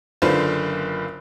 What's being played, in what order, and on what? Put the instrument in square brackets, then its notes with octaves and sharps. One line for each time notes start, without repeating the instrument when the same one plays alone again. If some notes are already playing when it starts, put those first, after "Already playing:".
[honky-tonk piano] F#1 D3 F4 B4 C5